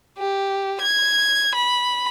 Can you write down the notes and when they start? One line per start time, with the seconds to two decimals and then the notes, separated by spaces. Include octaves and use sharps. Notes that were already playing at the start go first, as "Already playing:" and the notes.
0.18 G4
0.81 G#6
1.55 B5